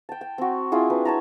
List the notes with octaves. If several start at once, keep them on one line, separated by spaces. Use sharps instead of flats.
G5 A5
G5
C4 F#4
C4 E4 F4 G#4
D4 F#4 B4
C#5 A5 A#5